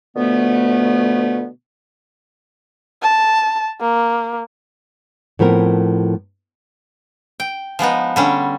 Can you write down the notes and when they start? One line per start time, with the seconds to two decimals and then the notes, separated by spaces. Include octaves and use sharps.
0.16 B2 D3 F3 A3 B3
3.02 A5
3.81 A#3
5.39 A2 F3 B3 C4 A#4
7.40 G5
7.79 F3 G#3 B3 D#4
8.16 D3 G3 C#4